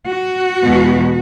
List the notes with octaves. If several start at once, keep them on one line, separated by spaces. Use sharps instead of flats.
F#4
E2 B2 G#3 B3